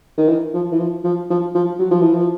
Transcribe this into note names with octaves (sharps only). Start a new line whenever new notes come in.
D#3
E3
F3
E3
F3
F3
F3
F3
F#3
F3
E3
F3